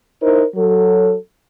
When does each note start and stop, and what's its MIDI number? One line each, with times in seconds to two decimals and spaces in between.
0.21 0.42 63
0.21 0.42 64
0.21 0.42 70
0.21 0.42 72
0.54 1.14 54
0.54 1.14 69